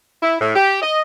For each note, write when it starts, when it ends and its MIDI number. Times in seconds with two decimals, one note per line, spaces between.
0.22 0.35 64
0.41 0.55 45
0.55 0.80 67
0.82 1.01 75